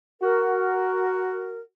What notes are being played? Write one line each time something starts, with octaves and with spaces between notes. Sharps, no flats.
F#4 A#4